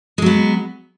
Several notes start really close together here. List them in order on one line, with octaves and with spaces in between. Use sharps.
G#3 F#3 B3